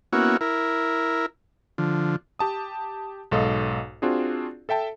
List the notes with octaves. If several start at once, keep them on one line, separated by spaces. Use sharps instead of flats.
A#3 B3 C#4 E4 F#4
E4 A#4
D3 F3
G4 A5 D#6
B1 G#2 A4 D#5 F5 D#6
C4 D4 F4 F#4 G#4
A4 E5 G5 A5